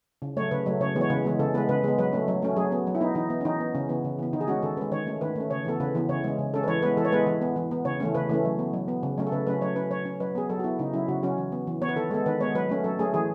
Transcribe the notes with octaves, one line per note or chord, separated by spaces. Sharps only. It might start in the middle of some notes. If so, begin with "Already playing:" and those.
C#3
F#3 A3 C#5
C#3 B4
F#3 A3
C#3 C#5
E3 G#3 B3
C#5
C#3 B4
E3 G#3 B3
C#3 A4
G#3 B3 B4
C#3 B4
G#3 B3
F#3 B4
A3 C#4
F#3
A3 C#4
F#3 G#4
B3
F#3
E4
B3 D#4
E3 D#4
B3
C#4
E3 D#4
B3
C#3 C#4
E3 B3
C#3
E3 B3
D#3 D#4
G#4
G#3 C#4 F#4
D#3 A4
G#3 C#4 B4
D#3 C#5
A3 C#4
D#3 B4
A3 C#4
C#3 C#5
E3 B3 A4
C#3 B4
E3 B3
C#3 C#5
G#3 C#4
C#3
G#3 C#4 A4
B4
E3 C#5
G#3 B3 B4
E3 A4
C#5
G#3 B3 B4
E3
B3
E3
B3
C#3 C#5
E3 A3 C#4
C#3 B4
E3 A3 C#4
F#3
B3
F#3
B3
C#3
F#3 A3 C#4
A4
C#3 B4
F#3 A3 C#4 B4
F#3 C#5
C#4 B4
F#3 C#5
C#4
F#3 B4
B3 G#4
F#3 A4
F#4
B3 E4
C#3 D#4
F#3 C#4 E4
C#3 F#4
F#3 C#4 F#4
E3
B3
E3
B3 C#5
B4
D#3 A4
G#3 B3 A4
D#3 B4
G#3 B3 C#5
F#3 B4
A3 C#4
F#3 A4
A3 C#4 G#4
E3 G#4